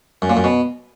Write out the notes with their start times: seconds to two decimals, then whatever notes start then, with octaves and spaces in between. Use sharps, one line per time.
0.22 F#2
0.30 A#2
0.37 F#2
0.44 B2